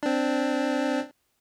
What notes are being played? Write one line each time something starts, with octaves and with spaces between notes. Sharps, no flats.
C4 D4